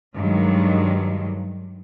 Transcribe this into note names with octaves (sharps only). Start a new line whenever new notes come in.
G2 D#3 F#3 G#3